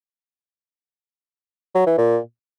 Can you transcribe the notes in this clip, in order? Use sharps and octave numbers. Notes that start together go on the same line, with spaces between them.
F#3
E3
A#2